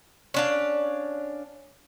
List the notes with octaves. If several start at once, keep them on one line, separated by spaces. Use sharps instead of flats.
C#4 D4 F5